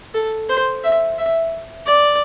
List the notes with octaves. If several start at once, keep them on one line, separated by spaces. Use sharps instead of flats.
A4
C5
E5
E5
D5